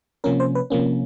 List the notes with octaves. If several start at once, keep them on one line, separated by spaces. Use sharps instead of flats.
C3 F3 A#3 C#4 A#4
C5
B4
C3 F3 A#3 C#4